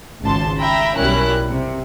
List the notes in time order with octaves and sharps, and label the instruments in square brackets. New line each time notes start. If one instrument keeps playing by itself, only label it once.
[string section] G#1 C#2 A5 C6
E5 G5 A#5 B5
B1 G3 C#4 E4 A#4 F#6
C3